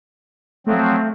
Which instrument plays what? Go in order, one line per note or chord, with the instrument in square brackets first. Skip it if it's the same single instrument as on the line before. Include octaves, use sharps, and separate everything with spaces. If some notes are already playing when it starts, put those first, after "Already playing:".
[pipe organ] F3 F#3 C4 [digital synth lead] A3